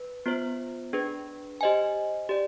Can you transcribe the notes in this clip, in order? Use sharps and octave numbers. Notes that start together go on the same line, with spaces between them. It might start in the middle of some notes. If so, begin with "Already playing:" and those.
Already playing: B4
B3 F4 C5
D4 G#4 B4
G4 C5 D#5 G#5
G4 D5